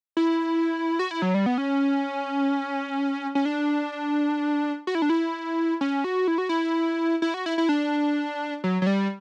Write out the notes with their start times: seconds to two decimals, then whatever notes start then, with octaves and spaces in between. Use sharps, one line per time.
0.17 E4
0.99 F#4
1.11 E4
1.22 F#3
1.34 G3
1.46 B3
1.58 C#4
3.35 C#4
3.45 D4
4.87 F#4
4.95 E4
5.02 D4
5.10 E4
5.81 C#4
6.04 F#4
6.28 E4
6.38 F#4
6.49 E4
7.22 E4
7.34 F#4
7.46 E4
7.58 E4
7.69 D4
8.64 F#3
8.82 F#3
8.87 G3